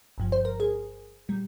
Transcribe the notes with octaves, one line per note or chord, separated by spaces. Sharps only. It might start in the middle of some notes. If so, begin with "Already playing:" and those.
G1 G2 F3
C5
A#4
G#4
A#2 G3